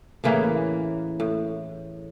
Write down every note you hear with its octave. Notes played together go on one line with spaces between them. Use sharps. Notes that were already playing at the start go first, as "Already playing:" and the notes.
A2 C#3 E3 A#3
A2